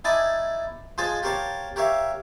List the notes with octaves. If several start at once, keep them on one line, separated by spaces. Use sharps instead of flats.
D#4 E4 D5 G#5 A5 D#6
F3 G#3 C5 D#5 G#5 A5
G4 A#4 C5 C#5 F5 A5
G4 A#4 C#5 E5 F5